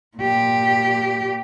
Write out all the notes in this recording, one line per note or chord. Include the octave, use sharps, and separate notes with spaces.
A#2 G4